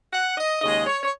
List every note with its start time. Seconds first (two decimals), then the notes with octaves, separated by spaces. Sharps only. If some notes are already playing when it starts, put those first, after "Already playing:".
0.13 F#5
0.37 D#5
0.62 D#2 C#3 G#3 D#5
0.86 C#5
1.03 C#5